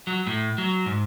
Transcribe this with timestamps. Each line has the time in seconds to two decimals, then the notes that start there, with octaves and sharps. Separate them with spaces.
0.07 F#3
0.27 A2
0.58 F#3
0.86 G#2